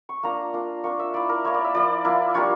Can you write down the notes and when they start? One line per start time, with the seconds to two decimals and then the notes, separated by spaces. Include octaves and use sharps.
0.09 C#6
0.23 A#3 D4 F4 A#5
0.53 A#3 D4 F4
0.84 A#3 D4 F4 C#6
0.99 E5
1.14 A#3 E4 D5
1.29 A#4
1.44 A#3 E4 C#5
1.54 D5
1.64 E5
1.75 F3 A#3 E4 D5
2.05 F3 A#3 E4
2.34 G3 A#3 D4 F4 C#5